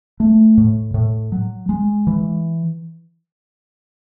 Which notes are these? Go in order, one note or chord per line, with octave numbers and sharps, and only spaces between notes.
A3
A2
A2
F#3
G#3
E3